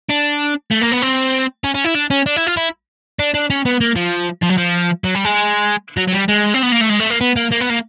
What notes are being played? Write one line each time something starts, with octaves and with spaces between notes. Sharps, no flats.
D4
A3
A#3
B3
C4
C#4
C#4
E4
D4
C#4
D4
E4
F4
E4
D4
D4
C#4
B3
A#3
F3
F3
F#3
F3
F#3
G3
G#3
F#3
F#3
G3
G#3
C4
B3
A#3
A3
G#3
A3
A#3
B3
A#3
A#3
B3
A#3